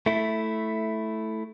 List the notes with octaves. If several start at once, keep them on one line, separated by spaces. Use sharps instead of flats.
A3 E4